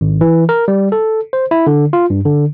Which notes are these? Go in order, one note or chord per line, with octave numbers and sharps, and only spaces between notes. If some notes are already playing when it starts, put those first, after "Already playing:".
G#1
E3
A#4
G3
A4
C5
E4
D3
F4
G2
D3